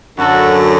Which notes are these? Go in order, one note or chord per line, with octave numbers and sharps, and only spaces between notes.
F#2 D3 F#3 F#4 A4